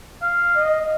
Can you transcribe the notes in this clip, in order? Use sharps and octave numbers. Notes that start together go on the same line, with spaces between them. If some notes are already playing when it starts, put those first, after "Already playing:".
F5
D#5